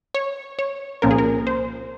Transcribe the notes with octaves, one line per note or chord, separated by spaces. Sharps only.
C#5
C#5
C2 A#2 F3 A#3 C#4 A#4
G#4
A#4
C5